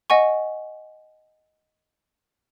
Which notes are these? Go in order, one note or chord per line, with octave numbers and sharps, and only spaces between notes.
D#5 F#5 G#5 C#6